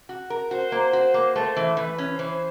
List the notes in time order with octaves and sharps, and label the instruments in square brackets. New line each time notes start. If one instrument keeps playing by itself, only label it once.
[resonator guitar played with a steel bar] F#4
A#4
[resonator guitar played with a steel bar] F#4 [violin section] C5
[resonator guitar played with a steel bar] A#3
F#4
A#3
[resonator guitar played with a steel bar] A3 [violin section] C5
[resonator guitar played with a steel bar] E3
[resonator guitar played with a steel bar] E3 [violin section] B4
[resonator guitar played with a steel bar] C#4
[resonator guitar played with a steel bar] E3 [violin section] C5